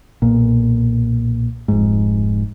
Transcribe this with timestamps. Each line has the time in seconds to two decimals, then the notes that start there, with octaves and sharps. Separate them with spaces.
0.22 B1 A#2
1.68 F1 G#2